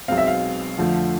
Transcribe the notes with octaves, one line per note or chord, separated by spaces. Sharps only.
B1 B2 G#3 C4 F5
E5
F5
F2 D3 F3 A3